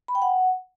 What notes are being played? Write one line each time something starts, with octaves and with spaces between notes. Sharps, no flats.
B5
G5
F#5